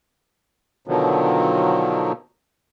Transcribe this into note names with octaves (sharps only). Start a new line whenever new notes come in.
B2 D3 D#3 F3 F#3